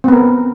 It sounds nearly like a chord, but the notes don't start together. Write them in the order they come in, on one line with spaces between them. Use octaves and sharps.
C4 B3 A#4